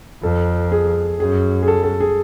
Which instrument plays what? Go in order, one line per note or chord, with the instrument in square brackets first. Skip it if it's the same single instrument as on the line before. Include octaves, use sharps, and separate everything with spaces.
[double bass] F2 [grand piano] A4
[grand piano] G#4
[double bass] F#2 [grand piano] G#4
[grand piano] G#4
A4
A4
G#4